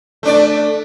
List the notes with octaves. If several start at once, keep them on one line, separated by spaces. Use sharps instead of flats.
A3 D4 D5